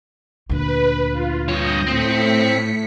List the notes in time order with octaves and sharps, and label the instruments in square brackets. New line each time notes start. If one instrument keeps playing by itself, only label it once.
[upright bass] D2 A#2 [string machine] B4
[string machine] F4
[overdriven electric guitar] G2 C#5 [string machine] D#6 G6 A#6
[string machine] A2 B6 C#7 [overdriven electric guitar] C4